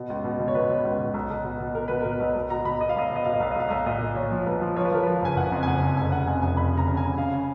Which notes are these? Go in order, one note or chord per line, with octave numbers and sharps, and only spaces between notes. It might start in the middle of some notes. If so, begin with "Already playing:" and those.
Already playing: B2
C#2
B2
B2
C#5
B2 B4
B2
C#2
B2
B1
B1
B2
B2
B2 A#4
B2 B4
B2 A#4
B1
B1
B2 A#5
B2 B5
B2 D#5
F5
B1 D#5
B2 F5
D#5
B2 F5
D#5
B1 F5
D#5
B1 F5
B1 D#5
F5
A#2 D#5
A#2
A#2 C#5
F3
B1 B4
F3
F3 C#5
B4
F3 A#4
F3 B4
F#1 G#5
F#1 F#5
F2
G#5
F#1 F#5
F2
F1 G#5
C#3 F#5
F2 G#5
F1 G#5
F2 B5
C#3 A#5
C#3
G#5
C#3
C#3 F5
C#3